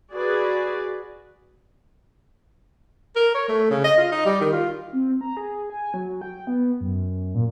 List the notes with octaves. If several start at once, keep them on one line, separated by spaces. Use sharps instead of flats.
F#4 G#4 B4 D5
A#4
C#5
A3
C#3
D#5
F4
D#4
G3
D#3
F4
C4
A#5
G#4
G#5
F#3
G5
B3
F#2
A#2